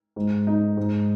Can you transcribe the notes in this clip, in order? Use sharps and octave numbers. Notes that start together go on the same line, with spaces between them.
G#2
D#4
G#2